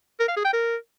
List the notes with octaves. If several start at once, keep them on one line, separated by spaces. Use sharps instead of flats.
A#4
F5
G#4
G5
A#4